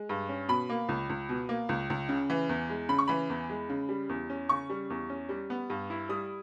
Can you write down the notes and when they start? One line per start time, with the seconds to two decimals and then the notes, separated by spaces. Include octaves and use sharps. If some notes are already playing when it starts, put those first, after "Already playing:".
Already playing: G#3
0.09 G2
0.29 C#4
0.49 B2 B5
0.69 A#3
0.89 C#2
1.09 C#2
1.29 B2
1.49 A#3
1.69 C#2
1.90 C#2
2.09 C#3
2.30 E3
2.49 E2
2.70 G#3
2.89 C#3 B5
2.99 C#6
3.08 E3 B5
3.30 E2
3.50 G#3
3.69 C#3
3.89 G3
4.09 E2
4.30 C#4
4.49 C#3 C#6
4.70 G3
4.90 E2
5.10 C#4
5.29 G3
5.50 B3
5.70 G2
5.90 E4
6.09 G3 D#6